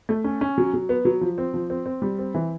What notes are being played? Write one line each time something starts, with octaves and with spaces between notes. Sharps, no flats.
A3
C#4
C#4
F#3
F#3
B3
F#3
F3
C4
F3
C4
C4
G3
C4
E3